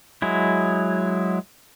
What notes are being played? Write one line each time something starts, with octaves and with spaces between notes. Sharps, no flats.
F#3 G#3 E4